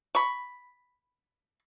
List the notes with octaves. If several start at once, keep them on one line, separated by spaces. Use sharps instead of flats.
B5 C#6